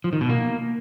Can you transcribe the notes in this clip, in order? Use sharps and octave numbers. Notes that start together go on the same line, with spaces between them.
F3
D#3
B2
A#3